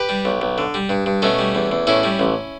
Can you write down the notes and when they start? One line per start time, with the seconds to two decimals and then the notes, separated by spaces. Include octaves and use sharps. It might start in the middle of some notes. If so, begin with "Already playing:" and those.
Already playing: G4 B4
0.09 G3
0.25 B1
0.42 B1
0.58 D3
0.74 G3
0.89 G2
1.06 G2
1.22 B2 A3 C#4
1.39 G3
1.55 E2
1.71 E2
1.87 A2 C#4 E4
2.03 G3
2.19 A1